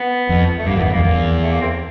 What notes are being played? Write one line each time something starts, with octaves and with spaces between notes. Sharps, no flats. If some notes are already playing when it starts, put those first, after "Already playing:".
Already playing: B3
F2
A3
G2 A#3
F2
B3
E2
F2 A#3
E2
A3
A#3
C4